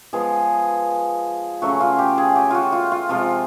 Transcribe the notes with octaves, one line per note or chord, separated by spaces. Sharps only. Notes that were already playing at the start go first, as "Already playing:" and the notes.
F3 G#3 B3 G#4
C#3 F#3 A3 C#4 F#4
F4
G4
G#4
G4
F4 F#4
F4
F4
C3 F3 G#3 F4